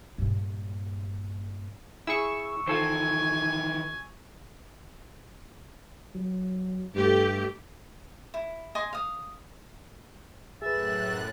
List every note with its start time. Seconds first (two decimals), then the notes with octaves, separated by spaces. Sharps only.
0.18 G2 A#2
2.07 E4 G#4 C#6 E6
2.67 D#3 E3 F4 A4 C5 G#5
6.15 F#3
6.95 G2 A3 G4
8.34 E4
8.75 D#5 G#5 C6 D6
8.93 F5 D#6
10.62 F#2 A2 G#4 B4 E5 F#6 A6